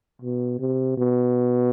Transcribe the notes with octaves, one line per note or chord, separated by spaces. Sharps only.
B2
C3
B2